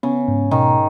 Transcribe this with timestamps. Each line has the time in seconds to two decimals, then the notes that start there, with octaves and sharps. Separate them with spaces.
0.03 C#3 B3
0.28 G#2
0.51 B2 D#3